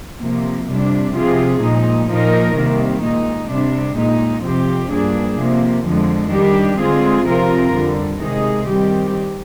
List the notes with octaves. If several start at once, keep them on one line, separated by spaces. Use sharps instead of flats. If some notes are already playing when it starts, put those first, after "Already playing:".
C3 F3 A#3
F2 C3 G3 D4
C3 F3 C4 F4 G#4
A#2 F3 G#3 D#4
A#2 F3 A#3 D#4 A#4
C3 D#3 G3 A#3
A#2 G#3 D#4
C3 G3 D4
A#2 G#3 D#4
F2 C3 F3 C4 G4
G2 F3 A#3 D4 G#4
C3 F3 A#3
F2 D3 F3 G#3
D#3 G3 D4 G4
D3 G#3 C4 F4 G#4
C3 F3 C4 F4 A#4
F2 D3 G3
C3 D#3 G#3 D#4 G#4
D#3 G3 C4 G4